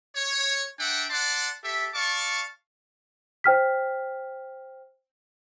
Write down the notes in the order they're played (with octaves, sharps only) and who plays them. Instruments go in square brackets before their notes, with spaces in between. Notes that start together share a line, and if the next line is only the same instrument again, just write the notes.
[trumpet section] C#5
D4 E5 F#5 G5
D5 F#5 A5 C6
G4 A4 E5
D5 F5 A5 C#6
[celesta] C5 G5 F6 B6